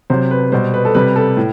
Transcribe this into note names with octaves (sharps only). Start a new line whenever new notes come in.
C3 F#3 C5
B4
B2 G3 C5
B4
A4
C3 G3 B4
A4
A2